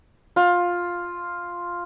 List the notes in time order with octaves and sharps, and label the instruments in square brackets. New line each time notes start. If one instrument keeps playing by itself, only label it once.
[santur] F4